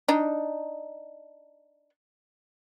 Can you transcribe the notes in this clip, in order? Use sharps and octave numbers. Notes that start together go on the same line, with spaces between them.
D4 D#4